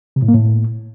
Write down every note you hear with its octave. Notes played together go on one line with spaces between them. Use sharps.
C3
A2
A#3
A2